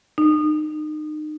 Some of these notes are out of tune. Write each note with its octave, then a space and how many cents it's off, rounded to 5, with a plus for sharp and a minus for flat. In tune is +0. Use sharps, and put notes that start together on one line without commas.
D#4 -30